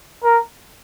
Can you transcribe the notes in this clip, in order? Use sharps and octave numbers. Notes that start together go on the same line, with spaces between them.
A#4